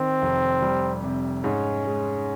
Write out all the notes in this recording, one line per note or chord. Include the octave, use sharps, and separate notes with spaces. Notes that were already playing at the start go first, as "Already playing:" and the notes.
Already playing: D#3 C4
F1
G3
C3
G#2 C#4
G#3